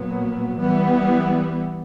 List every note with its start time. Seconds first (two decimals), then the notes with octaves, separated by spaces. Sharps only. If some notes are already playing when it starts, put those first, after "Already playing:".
Already playing: A#2 F#3 B3
0.57 E3 G3 B3